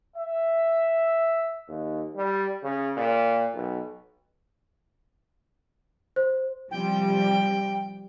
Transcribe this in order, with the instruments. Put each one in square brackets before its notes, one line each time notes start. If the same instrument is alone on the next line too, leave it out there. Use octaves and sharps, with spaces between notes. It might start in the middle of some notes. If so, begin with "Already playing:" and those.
[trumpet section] E5
[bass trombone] D#2
G3
C#3
A#2
B1
[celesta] C5
[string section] C3 F3 G3 [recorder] G5